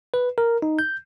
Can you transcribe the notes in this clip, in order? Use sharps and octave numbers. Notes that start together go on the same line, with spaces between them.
B4
A#4
D#4
G6